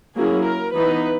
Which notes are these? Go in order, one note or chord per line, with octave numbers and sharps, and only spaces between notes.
F#3 A#3 C#4 E4 G#4
A#4
E3 B3 D#4 B4